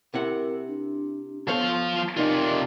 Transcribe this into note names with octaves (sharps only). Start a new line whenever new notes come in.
C3 E4 A#4 F#5
D4
F3 B3 A4 C5 C#5 F5
C3 D#4 F4 A#4 D5